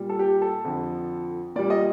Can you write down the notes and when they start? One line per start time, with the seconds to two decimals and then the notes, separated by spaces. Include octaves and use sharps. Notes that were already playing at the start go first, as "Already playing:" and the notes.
Already playing: A#2 G3
0.09 A4
0.19 G4
0.42 A4
0.64 F2 D3 F3
1.56 A#2 G3 D5
1.70 D#5